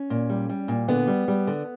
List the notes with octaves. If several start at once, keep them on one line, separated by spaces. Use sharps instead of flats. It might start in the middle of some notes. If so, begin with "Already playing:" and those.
Already playing: C#4
A#2
G3
G3
A#2
D3 B3
G3
G3
D3